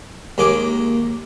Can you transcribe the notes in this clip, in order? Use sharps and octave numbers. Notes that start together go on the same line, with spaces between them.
D#2 G#3 A#3 G#5 D6